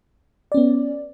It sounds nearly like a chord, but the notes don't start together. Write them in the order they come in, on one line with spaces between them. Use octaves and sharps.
D5 C#4 B3